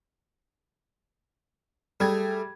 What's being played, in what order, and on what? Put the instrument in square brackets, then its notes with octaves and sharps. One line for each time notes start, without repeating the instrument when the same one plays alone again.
[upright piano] G3 G#6 [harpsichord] A3 G#4